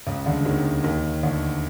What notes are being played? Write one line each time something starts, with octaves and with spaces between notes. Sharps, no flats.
C#2 C#3
D2 D3
D3
D#2 D#3
D#2 D#3
D2 D3